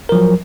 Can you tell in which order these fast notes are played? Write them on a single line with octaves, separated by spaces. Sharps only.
A#4 F3 F#3